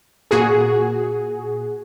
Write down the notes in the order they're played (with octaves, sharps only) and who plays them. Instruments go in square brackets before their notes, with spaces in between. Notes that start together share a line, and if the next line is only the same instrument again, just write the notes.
[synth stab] A#2 F#4 G#4